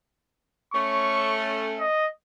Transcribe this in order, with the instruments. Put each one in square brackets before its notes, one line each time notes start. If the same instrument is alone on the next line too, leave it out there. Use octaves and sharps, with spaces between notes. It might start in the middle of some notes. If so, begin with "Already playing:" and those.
[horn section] A3 C#4 [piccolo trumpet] C#6
[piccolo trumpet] D#5